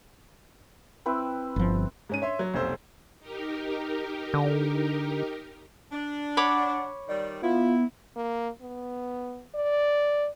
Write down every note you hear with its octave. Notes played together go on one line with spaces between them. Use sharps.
C4 E4 B4
G1 F3
G#2 C#4 D#7
C#5 E5 C6
F#3
F1 B1 C5 E6
D#4 G4 A#4
D3
D4
C#5 F#5 B5 D6
D#3 G3 D5
B3 E4 F4
A#3
B3
D5